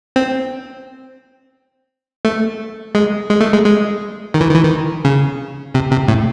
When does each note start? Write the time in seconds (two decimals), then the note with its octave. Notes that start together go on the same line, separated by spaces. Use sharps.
0.16 C4
2.25 A3
2.95 G#3
3.30 G#3
3.41 A3
3.53 G#3
3.65 G#3
4.34 D#3
4.41 E3
4.49 D#3
4.55 E3
4.63 D#3
5.05 C#3
5.74 C3
5.91 C3
6.08 A2